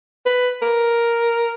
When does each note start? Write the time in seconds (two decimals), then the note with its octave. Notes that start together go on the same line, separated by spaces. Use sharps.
0.26 B4
0.62 A#4